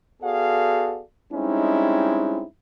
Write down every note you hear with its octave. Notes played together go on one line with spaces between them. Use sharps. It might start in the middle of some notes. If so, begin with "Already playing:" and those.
B3 F#4 G#4 A4 D5 F5
G3 G#3 C4 C#4 D#4 E4